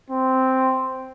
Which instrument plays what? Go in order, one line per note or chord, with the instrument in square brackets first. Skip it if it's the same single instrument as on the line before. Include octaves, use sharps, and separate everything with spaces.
[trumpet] C4